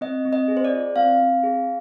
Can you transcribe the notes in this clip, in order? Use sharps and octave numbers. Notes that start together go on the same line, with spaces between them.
C4 D#5
C4
D#5
G#4
C5
D5
F4
C4 F5
C4
G#4